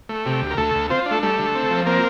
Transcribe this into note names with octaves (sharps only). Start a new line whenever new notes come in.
A3
C3 G4
D2
A#4
D2 A3 A4
D2
C4 F4 C5
D4
A3 A4
G3 A3 A4
D3
C4
F3
A#3 C4 A#4